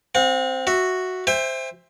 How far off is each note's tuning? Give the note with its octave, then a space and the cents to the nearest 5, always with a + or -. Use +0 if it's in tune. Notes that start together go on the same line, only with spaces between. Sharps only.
C4 +0 F#5 -45
F#4 +0 E5 +0
C5 +0 E5 +0 G5 +40